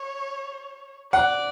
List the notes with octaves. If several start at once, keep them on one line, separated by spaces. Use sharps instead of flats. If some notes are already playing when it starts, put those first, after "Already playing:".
Already playing: C#5
D5 F#5